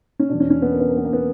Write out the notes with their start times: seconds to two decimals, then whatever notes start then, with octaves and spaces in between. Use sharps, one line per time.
0.19 C#4
0.29 E2 B2 D4
0.40 C#4
0.50 C#4
0.62 B3
0.72 A#3
0.80 B3
0.89 A#3
0.97 B3
1.05 A#3
1.13 B3